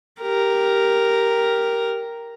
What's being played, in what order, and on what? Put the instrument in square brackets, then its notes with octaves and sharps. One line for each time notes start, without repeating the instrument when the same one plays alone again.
[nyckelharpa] G4 A#4